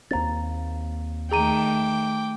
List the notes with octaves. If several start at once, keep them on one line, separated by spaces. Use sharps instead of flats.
D#2 A#3 C4 A#5 A6
D#3 A3 G#4 G5 A#5 D6 D#7